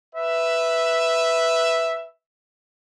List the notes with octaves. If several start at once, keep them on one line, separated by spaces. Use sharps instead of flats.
B4 E5